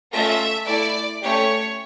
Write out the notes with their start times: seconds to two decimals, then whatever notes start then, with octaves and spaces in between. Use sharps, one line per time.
0.12 A3 C#4 F4 A4 E5
0.67 A3 E4 A4 D5
1.23 A3 C#4 G4 C#5